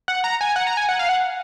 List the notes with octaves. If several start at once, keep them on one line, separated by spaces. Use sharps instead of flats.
F#5
A#5
G#5
F#5
A#5
G#5
F#5
F5
F#5